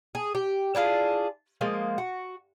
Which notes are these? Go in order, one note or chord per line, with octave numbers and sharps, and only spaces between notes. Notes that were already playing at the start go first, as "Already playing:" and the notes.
G#4
G4
D4 E4 F4 G#4
F3 G#3 A#3 D#5
F#4